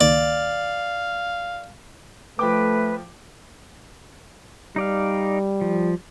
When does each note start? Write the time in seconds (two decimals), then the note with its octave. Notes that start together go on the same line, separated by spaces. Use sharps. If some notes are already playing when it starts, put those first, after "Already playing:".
0.01 C#2 D#3 A#3 D5 F5
2.39 F3 A3 B4 G5 D6
4.76 G3 D#4 D5 F5
5.61 F3